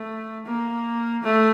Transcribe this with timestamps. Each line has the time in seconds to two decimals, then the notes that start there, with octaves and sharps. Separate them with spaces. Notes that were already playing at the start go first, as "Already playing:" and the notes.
Already playing: A3
0.46 A#3
1.23 A3